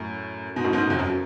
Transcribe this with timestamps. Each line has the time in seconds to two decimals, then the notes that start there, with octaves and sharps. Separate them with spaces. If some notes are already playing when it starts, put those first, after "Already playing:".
Already playing: F#2 A2
0.56 G#2 B2
0.64 F#2 A2
0.73 G#2 B2
0.90 F2
0.99 F#2